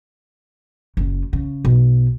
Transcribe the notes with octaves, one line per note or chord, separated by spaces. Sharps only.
F#1
C#3
B1